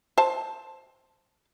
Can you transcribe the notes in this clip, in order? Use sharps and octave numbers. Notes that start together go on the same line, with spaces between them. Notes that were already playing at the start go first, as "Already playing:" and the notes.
C5 A5